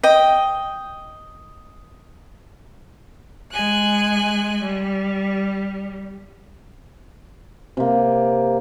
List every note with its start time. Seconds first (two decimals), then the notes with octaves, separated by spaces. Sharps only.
0.03 D#5 G5
3.51 G#3 G#5 F#6
4.64 G3
7.77 C3 A#3